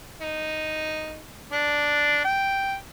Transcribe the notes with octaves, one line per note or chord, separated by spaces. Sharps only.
D#4
D4
G5